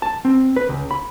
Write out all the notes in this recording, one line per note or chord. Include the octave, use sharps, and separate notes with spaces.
A5
C4
B4
C#2
B5